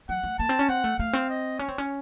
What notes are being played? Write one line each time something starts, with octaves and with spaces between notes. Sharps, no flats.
F#3 F#5
A3
A#3 A5
C4
C#4
C4 F#5
A3
A3 F5
C4
D#5
C#4 C#5
C4
C#4